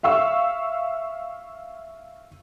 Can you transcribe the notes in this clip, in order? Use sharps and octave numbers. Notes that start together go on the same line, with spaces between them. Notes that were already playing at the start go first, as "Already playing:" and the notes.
E5 F5 C#6 E6